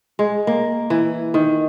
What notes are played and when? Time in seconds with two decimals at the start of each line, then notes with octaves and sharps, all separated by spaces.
0.19 G#3
0.47 A#3
0.90 E3
1.34 D#3